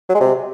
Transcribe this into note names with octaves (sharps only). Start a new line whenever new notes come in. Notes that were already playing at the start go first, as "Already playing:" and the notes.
F#3
G#3
C3